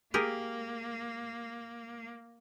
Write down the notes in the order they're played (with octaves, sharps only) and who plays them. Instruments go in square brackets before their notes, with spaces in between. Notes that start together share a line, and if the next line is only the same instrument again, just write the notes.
[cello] A#3 [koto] G4 G#4 A#4